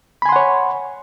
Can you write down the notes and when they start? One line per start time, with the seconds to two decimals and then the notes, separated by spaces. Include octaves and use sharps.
0.22 B5
0.26 G#5
0.29 C6
0.32 F#5
0.36 C#5